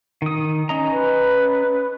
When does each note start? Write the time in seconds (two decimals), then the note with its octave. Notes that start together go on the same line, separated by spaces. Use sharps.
0.22 D#3 D#6
0.69 C#4 D#5 A#5
0.92 B4